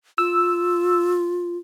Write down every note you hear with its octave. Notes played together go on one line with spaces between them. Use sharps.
F4 E6